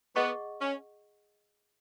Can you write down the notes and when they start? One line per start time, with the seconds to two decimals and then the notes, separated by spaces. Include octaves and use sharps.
0.16 B3 G#4 D#5 F#5 C#6
0.60 C#4